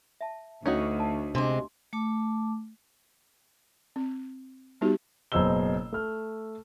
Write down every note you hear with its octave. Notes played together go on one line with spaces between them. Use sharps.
E5 A5
D2 C#4 D#4 F#4
A5
C3 G#3 D4 C6 D6
A3 A5 D6
C4
G3 B3 D#4 F#4 G4
F#1 B2 C5 D#5 E6 G7
A3 F6